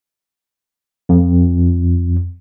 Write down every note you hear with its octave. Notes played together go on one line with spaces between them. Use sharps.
F2